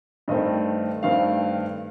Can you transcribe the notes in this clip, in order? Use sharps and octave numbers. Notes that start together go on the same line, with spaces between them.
G2 D#3 A3 C4 D#5
G2 D#3 A3 C4 F5